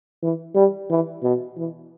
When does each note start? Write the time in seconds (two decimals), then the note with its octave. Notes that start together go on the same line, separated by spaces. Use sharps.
0.23 E3
0.55 G3
0.90 E3
1.23 B2
1.57 E3